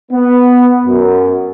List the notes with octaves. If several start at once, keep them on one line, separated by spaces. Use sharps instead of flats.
B3
F#2